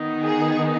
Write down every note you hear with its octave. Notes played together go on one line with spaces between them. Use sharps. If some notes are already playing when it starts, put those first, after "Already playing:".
Already playing: D#3 B3 D#4
G#4